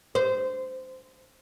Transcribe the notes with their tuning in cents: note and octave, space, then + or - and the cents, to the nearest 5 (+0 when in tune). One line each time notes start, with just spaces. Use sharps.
C5 -20